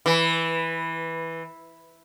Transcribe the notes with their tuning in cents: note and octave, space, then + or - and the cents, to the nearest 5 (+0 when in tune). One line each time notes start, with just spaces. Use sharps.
E3 -5